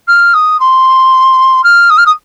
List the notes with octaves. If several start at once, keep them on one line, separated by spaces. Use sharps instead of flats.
F6
D#6
C6
F6
D#6
F6
D#6